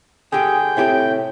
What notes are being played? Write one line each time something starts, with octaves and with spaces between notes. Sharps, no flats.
D3 G4 G#4 G5
A2 C3 E4 G4